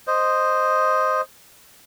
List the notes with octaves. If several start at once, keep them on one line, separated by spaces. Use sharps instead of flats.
C5 D#5